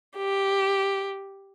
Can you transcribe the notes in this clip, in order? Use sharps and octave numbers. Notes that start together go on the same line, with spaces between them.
G4